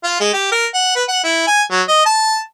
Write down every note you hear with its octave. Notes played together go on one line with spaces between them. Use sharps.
F4
G#3
G4
A#4
F#5
B4
F#5
E4
G#5
F#3
D#5
A5